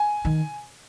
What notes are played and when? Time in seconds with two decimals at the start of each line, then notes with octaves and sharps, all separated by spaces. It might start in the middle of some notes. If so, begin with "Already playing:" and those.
Already playing: G#5
0.25 D#3